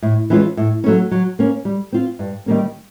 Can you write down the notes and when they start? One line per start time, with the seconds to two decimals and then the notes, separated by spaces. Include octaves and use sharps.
0.02 A2
0.30 E3 G#3 C#4 F4
0.57 A2
0.84 F#3 A3 C#4
1.11 F#3
1.39 A#3 C#4
1.65 G3
1.92 C4 F4
2.19 G2
2.46 D#3 G3 A#3 C#4